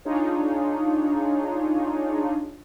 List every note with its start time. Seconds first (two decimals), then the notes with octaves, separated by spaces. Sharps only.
0.05 D4 D#4 F4 G#4 C#5